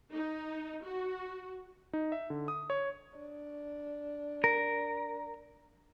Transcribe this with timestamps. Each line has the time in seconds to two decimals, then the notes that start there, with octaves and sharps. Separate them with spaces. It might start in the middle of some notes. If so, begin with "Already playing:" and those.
0.14 D#4
0.86 F#4
1.93 D#4
2.12 E5
2.30 D3
2.48 D#6
2.70 C#5
3.17 D4
4.44 A#4